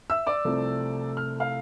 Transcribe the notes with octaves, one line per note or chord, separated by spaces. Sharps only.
E5 E6
D5 D6
C2 C3 F3 A3 C4
F6
F5 F6